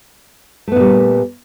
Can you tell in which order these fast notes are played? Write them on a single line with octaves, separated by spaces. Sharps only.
A3 B3 A#2 G3